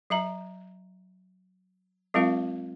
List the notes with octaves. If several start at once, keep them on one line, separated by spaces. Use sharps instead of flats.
F#3 E5 A#5
F#3 G#3 C4 F4 A#4 F5